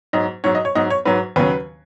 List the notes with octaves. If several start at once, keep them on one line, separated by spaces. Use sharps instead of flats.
G#2 F#3 D#5
G#2 F#3 C#5
D#5
C#5
G#2 F#3 D#5
C#5
G#2 F#3 B4
D#2 C#3 F#3 B4